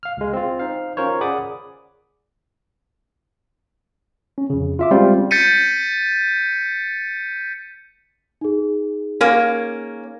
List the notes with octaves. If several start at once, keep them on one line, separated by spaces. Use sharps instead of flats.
F5 F6
C#2 G#3
C4 F4
D#4 C5 F5
C#4 F4 A#4 C5 C#5
G#4 D5 F#5 B5 D6 D#6
C#4
F2 C#3
F4 E5 D6
G3 G#3 C4 C#4 F4 G4
G6 A6 B6 C#7 D#7
D#4 G#4
A#3 C#4